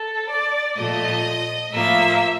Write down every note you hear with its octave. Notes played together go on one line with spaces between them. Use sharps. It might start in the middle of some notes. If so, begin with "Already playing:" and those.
Already playing: A4
D5
A#2 F3 A3 D#5
A2 F3 A#3 E5